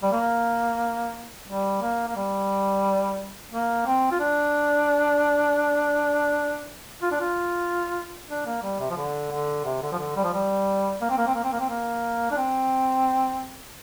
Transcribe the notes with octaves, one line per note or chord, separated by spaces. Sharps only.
G3
A#3
G3
A#3
A#3
G3
A#3
C4
F4
D4
F4
D4
F4
D4
A#3
G3
C3
F3
D3
D3
C3
D3
F3
D3
G3
F3
G3
A#3
C4
A#3
C4
A#3
C4
A#3
C4
A#3
D4
C4